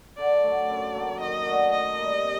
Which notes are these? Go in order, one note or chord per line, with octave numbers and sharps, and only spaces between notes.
D3 D5
F#3 A3
F#2
F#3 A#3
D#3 D#5
A3 D4 F#4
D#3 D#5
G3 A#3
C3